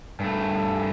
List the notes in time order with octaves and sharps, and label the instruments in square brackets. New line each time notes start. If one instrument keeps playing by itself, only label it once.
[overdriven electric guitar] G2 A3